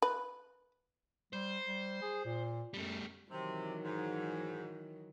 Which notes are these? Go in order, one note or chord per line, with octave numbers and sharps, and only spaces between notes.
B4
G3 C5
G3
G#4
A#2
F#2 G3 A3
C3 D#3 E3 F#3
G#2